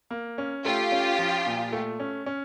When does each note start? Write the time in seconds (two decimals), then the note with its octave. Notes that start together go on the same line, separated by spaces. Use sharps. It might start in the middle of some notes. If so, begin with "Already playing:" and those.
0.11 A#3
0.38 C#4
0.64 A3 F4 G4
0.92 C#4
1.19 F3
1.46 A#2
1.72 A3
2.00 C#4
2.26 C#4